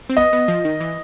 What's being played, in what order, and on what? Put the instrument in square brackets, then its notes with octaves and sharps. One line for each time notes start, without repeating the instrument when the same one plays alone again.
[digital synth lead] C4
[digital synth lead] B3 [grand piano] D#5
[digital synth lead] B3
F3
D#3
E3